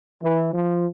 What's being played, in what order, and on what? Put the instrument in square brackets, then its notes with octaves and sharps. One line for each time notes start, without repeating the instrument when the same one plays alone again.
[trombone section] E3
F3